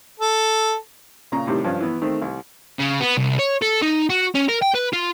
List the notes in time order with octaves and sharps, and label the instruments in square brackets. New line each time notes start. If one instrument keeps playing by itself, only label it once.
[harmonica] A4
[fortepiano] A#2 C#3 A#5
A2 C3 D#3 G3
G2 F3 C#4
E3 B3
D#3 A3 C4
C2
[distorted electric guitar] C#3
B3
C2
C#5
A4
D#4
F#4
C#4
A#4
G5
B4
F4